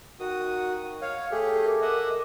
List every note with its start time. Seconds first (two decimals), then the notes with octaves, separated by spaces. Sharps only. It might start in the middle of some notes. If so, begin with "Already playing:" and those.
0.20 D#3 F#4 D#6
1.02 C#5 F5
1.31 A3 G4 G#4
1.64 A#4 D6
1.82 D#5 E5 F#5